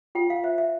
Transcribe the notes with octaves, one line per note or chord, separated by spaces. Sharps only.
F4 G5
F5
C5 E5
E5